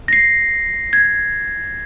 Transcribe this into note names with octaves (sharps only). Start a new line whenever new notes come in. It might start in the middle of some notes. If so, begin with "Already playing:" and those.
A#6 C7
G#6